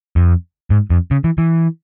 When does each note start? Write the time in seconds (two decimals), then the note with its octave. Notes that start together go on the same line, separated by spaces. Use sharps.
0.16 F2
0.70 G#2
0.90 F2
1.11 C#3
1.24 E3
1.38 E3